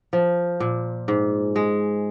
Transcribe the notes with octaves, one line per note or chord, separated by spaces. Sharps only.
F3
A#2
G#2
G#3